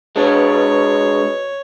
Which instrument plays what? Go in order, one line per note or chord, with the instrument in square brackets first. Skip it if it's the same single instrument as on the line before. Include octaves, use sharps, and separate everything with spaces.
[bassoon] B2 [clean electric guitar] G#3 D4 [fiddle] C#5